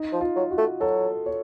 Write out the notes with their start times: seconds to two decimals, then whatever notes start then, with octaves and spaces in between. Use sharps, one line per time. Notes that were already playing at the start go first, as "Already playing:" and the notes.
Already playing: D#4
0.13 F3
0.21 F4
0.36 F#3
0.51 F#4
0.58 A3
0.80 F#3 A4
1.26 C#5